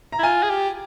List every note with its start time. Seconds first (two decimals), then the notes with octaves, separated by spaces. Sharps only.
0.12 A#5
0.19 E4
0.23 F4 G#5
0.43 G#4
0.50 G4